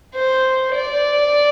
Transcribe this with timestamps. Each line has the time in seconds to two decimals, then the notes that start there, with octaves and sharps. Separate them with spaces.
0.14 C5
0.75 D5